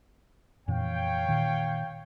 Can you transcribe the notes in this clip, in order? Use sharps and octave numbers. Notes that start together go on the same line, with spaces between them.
F2 A#2 E3 C#5 F5 G5
A#2 D#3